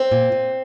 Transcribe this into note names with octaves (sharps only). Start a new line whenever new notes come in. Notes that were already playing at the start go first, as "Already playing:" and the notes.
Already playing: C4
A#2
A#2